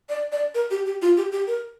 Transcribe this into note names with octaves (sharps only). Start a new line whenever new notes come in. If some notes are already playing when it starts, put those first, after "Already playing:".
D5
D5
A#4
G4
G4
F4
G4
G4
A#4